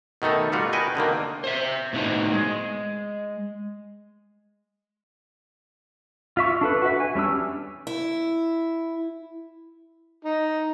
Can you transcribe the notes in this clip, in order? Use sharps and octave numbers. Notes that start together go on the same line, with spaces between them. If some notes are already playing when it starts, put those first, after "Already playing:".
B2 D#3 A3 D#4 A4
G3 A3 F4 F#4
F#4 A#4 B4 D#5 G5 G#5
B2 D3 D#3 A#3
C5 E5
A2 B3 D#4 C5
G#3
F4 E5 C#6
D4 A4 B4
F#4 B4 E5
G#5
G3 C#4 D4 E6
E4
D#4